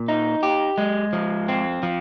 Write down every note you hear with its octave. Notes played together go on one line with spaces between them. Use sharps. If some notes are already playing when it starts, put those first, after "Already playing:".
Already playing: A#2
D#4
G4
G#3
F3
C4
F3